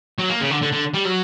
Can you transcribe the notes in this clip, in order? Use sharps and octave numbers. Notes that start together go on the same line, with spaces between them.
F#3
A#3
C#3
D3
D3
D3
G3
F#3